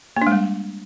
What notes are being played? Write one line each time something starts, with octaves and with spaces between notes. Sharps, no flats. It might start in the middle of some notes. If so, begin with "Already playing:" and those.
A#3
D4
G#3
G3